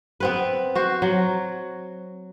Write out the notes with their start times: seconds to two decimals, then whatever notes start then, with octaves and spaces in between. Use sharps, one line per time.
0.20 B3 C4 B4
0.75 F#4 C5
1.02 F#3